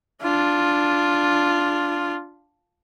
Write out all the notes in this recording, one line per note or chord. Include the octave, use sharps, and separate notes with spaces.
D4 F4